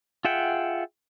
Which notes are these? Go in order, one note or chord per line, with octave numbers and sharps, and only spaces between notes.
F4 G#4 E5 F#5 G5